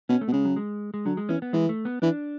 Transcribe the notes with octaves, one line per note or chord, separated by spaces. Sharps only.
B2 C#4
A3
B2
C#3 G#3
F#3
G#3
G#3
D3 F#3
G#3
E3 C#4
B3
E3 G#3
A3
B3
E3 D4